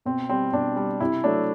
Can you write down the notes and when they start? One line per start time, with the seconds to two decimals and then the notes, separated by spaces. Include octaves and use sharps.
0.05 B2 C4
0.29 G3 C4
0.53 B2 D4
0.76 G3
1.00 C3 E4
1.24 F#3 A3 D4